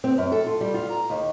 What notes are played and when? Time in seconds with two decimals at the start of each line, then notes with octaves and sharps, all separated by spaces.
0.04 C4
0.18 F#2
0.32 A4
0.46 F4
0.61 G3
0.74 F4
0.89 A#5
1.10 D#2